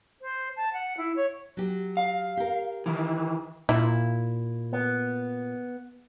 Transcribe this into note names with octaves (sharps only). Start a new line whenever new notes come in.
C5
A5
F#5
E4
C#5
F#3 G4
F5
G4 A#4
D#3 E3
A#2 E4
B3